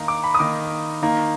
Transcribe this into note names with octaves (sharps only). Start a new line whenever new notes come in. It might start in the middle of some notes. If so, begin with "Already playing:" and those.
Already playing: D#3 A#3 D#4 A#5
D6
B5
D#6
D#3 A#3 D#4 D6
D#3 A#3 D#4